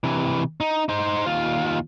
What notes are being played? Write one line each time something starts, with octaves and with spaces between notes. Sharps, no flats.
C3 E3
D#4
D#4 C5
D#2 F4